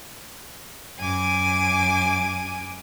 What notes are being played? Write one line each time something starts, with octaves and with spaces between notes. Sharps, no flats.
F#2 G#5 D6